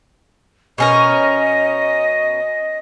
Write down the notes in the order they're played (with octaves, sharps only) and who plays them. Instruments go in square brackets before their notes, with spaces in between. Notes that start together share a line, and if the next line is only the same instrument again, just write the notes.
[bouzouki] B2 C#4 A#4 [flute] D#5